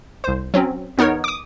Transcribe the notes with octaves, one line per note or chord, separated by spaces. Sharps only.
C2 C5
F#3 C4 C#4
E2 B3 D#4 A#4 C#5
D6 D#6